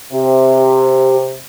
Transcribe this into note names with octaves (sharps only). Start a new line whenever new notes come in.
C3 G4